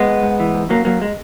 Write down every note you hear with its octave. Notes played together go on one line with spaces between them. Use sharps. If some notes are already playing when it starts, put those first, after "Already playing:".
Already playing: G#3 B3
G#2
G#2
E3
G#2
F#2 F#3 A#3
F#2 F#3 A#3
G#3